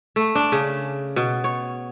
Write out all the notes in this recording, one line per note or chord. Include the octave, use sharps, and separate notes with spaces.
A3
D4
C#3
B2
C#5